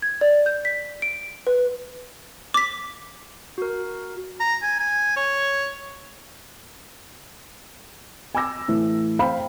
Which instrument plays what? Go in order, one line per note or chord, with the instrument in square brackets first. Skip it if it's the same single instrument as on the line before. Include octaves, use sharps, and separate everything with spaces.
[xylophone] G#6
D5
G6
B6
D7
B4
D6 B6
[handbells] F#4 A#4
[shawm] A#5
G#5
G#5
C#5
[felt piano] G#5 B5 D6 E6 A#6
A2 E3
C5 F5 G5 B5